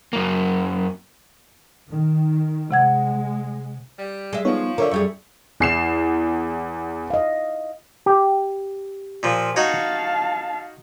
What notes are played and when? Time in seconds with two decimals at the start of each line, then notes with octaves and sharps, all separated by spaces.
0.13 F#2 A#3
1.89 D#3
2.71 C3 G#3 F#5 G#6
3.98 G3
4.33 G#3 E5
4.45 F3 B3 D#4 C#5
4.78 D3 A#4 C#5 E5
4.91 F#2 G3 G#4 E5 C#6
5.60 E2 E4 C7 E7
7.10 D#5 F5
8.06 G4
9.23 A#2 F3
9.56 D#4 F#4 C#5 F5 A5